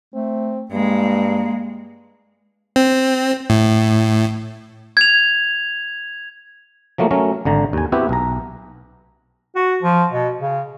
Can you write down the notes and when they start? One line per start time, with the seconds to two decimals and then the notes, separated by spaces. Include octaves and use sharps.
0.14 A3 C4
0.71 G2 G#3 A#3
2.76 C4
3.50 A2
4.97 G#6 F7
6.98 F3 F#3 A3 A#3
7.11 F#3 A3 C#4 A#4
7.45 G#1 D3 A#5
7.73 D#2 G#5
7.92 B3 C4 E4 F#4 G4 B4
8.09 B1 A#5
9.55 F#4
9.83 F3
10.12 B2
10.40 C#3